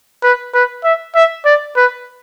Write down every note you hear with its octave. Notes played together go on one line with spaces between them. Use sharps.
B4
B4
E5
E5
D5
B4